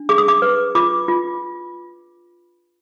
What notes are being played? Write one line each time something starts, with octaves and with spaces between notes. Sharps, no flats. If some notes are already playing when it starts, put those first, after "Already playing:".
Already playing: D4
G#4 D6
D#6
D6
B4
F4 D6
F4